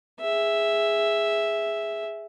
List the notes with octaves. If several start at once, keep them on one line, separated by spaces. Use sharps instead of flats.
G#4 E5